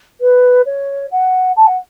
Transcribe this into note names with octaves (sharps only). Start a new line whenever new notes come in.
B4
C#5
F#5
A5
F#5